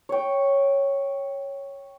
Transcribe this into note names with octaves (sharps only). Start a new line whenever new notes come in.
C#5 G5